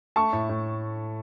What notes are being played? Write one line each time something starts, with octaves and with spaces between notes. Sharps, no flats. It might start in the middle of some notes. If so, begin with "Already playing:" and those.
A3 A5 C#6
A2
A2